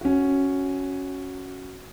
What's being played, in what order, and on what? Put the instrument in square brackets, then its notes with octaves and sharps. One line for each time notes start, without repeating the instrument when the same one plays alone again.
[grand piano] C#4 F#4